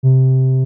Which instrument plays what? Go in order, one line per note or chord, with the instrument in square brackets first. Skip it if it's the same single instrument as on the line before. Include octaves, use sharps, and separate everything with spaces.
[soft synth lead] C3